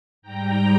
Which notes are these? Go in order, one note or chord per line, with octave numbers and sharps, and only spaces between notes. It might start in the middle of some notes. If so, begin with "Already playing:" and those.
G#2 G3 G5 A#5